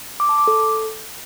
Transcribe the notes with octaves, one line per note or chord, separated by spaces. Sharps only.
D6
A5
D6
A4